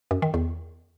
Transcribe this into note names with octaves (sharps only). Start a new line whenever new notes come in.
F#2
D#3
E2